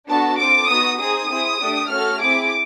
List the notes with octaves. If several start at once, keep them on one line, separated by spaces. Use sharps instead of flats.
B3 D4 F#4 A4 A5
C4 F4 A4 D6
B3 D#4 F#4 D#6
C4 D#4 G#4 D#6
C4 E4 G#4
A3 D4 G4
A3 C#4 F#4 A4 F6
C4 E4 G#4 D6